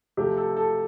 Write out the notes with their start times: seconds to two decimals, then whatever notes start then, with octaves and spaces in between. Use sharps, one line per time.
0.17 C3 F3 A3 G4
0.37 A4
0.57 A4